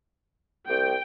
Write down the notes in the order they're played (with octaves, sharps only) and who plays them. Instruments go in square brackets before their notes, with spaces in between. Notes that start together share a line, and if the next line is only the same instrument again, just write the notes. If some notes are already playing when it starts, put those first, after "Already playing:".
[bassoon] C2 [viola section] G5